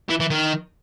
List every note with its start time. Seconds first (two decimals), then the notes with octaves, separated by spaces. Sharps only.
0.09 E3
0.20 E3
0.30 D#3